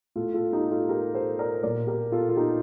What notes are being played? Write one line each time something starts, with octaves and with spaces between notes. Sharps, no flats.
A2 F4 A4
F4 A4
D#4 G4
F4 A4
G4 A#4
A4 C5
A#4 D5
A#2 A#4 D5
G4 A#4
F4 A4
F4
D#4 G4